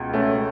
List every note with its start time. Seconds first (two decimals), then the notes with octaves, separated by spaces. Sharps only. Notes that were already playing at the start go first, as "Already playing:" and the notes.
Already playing: C#2 B2
0.13 A3 C#4